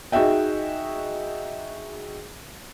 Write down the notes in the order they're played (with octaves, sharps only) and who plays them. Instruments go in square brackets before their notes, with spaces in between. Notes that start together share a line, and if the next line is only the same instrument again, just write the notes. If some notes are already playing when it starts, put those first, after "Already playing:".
[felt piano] D#4 F#4 G#4 D#5 E5 G5